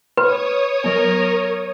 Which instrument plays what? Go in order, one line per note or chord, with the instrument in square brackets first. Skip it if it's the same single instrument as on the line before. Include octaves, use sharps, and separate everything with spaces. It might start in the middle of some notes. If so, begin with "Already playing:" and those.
[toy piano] B4 [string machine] C#5 D#6 [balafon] B5
[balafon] F#3 B3 [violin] A#4